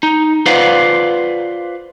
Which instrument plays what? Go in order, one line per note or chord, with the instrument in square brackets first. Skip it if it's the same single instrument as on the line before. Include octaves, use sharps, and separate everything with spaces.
[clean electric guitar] D#4
F4 B4 C5 D5 F5 F#5